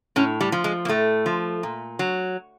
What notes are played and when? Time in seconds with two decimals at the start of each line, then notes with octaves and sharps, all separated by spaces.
0.16 A2 C#4
0.41 G3
0.52 F3
0.64 G#3
0.85 A#3
0.88 A2 A3
1.26 F3
1.63 A#2
1.99 F#3